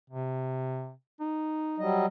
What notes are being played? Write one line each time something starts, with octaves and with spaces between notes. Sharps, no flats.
C3
D#4
F#3 G3 D#5